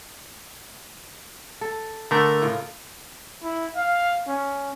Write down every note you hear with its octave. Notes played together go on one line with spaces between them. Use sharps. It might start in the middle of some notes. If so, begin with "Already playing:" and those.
A4
D3 A3 A#4
A2 C#3 F4
E4
F5
C#4